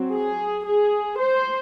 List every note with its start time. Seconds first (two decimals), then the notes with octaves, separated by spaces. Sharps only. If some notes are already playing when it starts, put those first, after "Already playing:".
Already playing: F#3 C4
0.12 G#4
0.66 G#4
1.19 C5